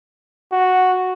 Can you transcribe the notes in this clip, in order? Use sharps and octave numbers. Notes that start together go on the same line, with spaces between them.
F#4